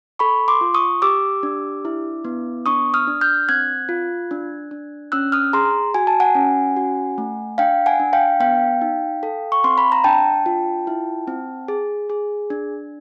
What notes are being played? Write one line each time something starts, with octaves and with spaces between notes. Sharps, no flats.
A4 B5 C#6
C6 D6
F4
C#6 D#6
G4 D6 E6
D4
E4
B3
D4 C#6 D#6
D#6 F6
D4
F6 G6
C4 F#6 G#6
F4
D4
D4
C#4 E6 F#6
D#6 F6
G#4 A#5 C6
F#4 G#5
A5
F#5 G#5
C#4
F#4
A3
D4 F5 G5
F#5 G#5
D4
F5 G5
B3 F5 G5
D#4
A4
C#6
C4 C6
B5
A#5
D4 G5 A5
F4
E4
C4
G#4
G#4
D4